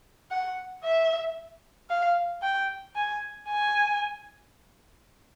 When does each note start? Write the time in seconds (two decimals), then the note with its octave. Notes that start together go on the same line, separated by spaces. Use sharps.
0.31 F#5
0.84 E5
1.90 F5
2.43 G5
2.96 G#5
3.48 G#5